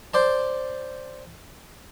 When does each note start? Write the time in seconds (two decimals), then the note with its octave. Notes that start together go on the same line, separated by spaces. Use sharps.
0.14 C5 D5 A5